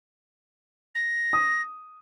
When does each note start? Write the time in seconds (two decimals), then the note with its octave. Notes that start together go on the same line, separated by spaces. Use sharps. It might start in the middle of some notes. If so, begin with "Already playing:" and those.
0.95 A#6
1.33 D#6